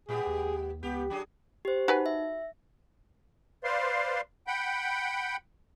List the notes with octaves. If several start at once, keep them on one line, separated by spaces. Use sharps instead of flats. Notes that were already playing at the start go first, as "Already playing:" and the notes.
A#2 G#3 B3 G4 G#4
D#2
C#2 B3 G4
F#3 D4 G4 G#4
G4 C5
D#4 F#4 B4 G#5
E5
B4 C5 D5 F5 C6
F#5 G5 B5 G6